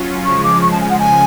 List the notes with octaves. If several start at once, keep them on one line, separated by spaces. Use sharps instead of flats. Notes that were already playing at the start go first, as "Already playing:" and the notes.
Already playing: F#3 C#4 F4
C#3 F3 G#3 C#6
D6
C#6
A5
G#5
F#5
G#5